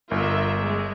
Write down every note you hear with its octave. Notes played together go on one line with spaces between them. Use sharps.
G1 F4 A#4 E5
G#3